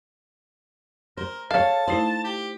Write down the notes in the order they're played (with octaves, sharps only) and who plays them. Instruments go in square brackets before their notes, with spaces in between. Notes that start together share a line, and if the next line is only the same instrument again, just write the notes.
[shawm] A#4 [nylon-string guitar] C5
[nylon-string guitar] A4 C#5 [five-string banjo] F5 [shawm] A5
[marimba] A3 D#4 E4 [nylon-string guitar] C5
[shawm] G4